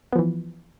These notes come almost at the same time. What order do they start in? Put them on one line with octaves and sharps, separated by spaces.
B3 F3 E3